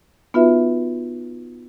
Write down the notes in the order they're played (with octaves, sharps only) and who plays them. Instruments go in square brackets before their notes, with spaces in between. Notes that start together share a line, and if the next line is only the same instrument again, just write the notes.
[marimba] B3 D#4 F4 F#4 B4 E5